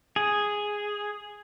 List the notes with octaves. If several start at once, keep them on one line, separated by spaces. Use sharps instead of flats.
G#4